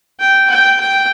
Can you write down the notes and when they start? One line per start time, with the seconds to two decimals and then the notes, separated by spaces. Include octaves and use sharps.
0.20 G5
0.50 G5
0.80 G5